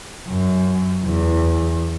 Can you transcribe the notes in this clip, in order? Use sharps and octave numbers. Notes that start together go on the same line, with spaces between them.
F#2
E2